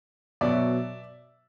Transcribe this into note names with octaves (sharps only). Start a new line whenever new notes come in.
B2 F#3 D5 E5